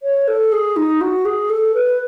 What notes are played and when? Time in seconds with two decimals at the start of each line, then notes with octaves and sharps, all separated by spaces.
0.03 C#5
0.28 A4
0.52 G#4
0.76 D#4
1.01 F#4
1.25 G#4
1.50 A4
1.74 B4